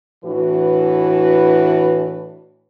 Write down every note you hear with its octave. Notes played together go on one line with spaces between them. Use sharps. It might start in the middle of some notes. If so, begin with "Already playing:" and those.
A2 E3 D4 F#4 B4